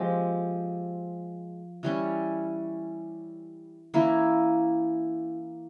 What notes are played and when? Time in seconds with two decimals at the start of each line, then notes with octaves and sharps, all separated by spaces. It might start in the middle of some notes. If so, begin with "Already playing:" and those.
Already playing: F3 G#3 C4 G4
1.83 E3 G3 C#4
3.94 E3 A#3 C#4 E4